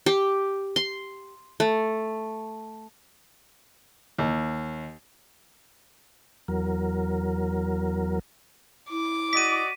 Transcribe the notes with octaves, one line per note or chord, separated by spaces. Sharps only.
G4
C6
A3
D#2
E2 F#3 A#4
E4 D6
F#4 D5 D#5 B6 D#7